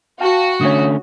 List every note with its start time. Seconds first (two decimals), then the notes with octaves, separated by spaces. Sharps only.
0.20 F#4 F5 G5 A5
0.61 D3 A3 C#4 C#5 D#6